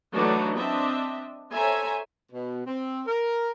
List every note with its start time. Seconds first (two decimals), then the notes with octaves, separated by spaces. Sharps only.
0.14 E3 F#3 A3 D4 D#4 F#4
0.57 C4 D4 D#5 E5
1.53 A4 C5 C#5 E5 G#5 A#5
2.32 B2
2.67 C4
3.07 A#4